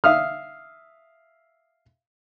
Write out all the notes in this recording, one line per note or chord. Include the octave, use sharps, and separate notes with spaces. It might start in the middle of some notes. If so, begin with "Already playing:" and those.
E5 F5 D#6 F6